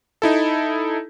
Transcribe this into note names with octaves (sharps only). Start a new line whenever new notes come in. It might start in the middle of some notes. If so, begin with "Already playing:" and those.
D#4 E4 A4